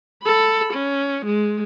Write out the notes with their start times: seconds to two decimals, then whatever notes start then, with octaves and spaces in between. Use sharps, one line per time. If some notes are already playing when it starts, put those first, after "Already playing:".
0.24 A4 B5
0.74 C#4
1.26 G#3